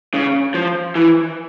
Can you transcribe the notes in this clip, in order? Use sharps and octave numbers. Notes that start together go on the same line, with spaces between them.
C#3
F3
E3